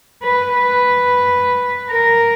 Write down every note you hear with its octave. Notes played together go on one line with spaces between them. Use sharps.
B4
B4
A#4